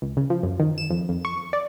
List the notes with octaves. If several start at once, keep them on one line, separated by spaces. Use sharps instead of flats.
C#2
C#3
F3
F#2
D#3
E7
F2
F2
C#6
D5